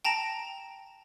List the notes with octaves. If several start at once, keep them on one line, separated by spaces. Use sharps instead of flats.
G5 A5 A#5 A#6 D7